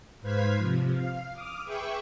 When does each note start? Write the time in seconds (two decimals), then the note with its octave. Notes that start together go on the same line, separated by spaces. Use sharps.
0.21 G#2 B4 C5 F5 G#6 B6
0.58 C3 F3
0.92 F5
1.33 D6 D#6 F6
1.65 G#4 B4 E5 G5 C#6 D6